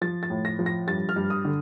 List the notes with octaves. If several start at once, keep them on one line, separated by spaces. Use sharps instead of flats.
F3 A6
A6
A2
A#6
F3
A#6
G2 A6
F6
G2
D#6
D3